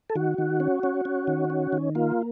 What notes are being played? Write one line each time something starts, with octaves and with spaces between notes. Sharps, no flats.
A4
D#3 F#4
D#3
C#4
C#4
C#4
D#3
C#4
D#3
A#3 F4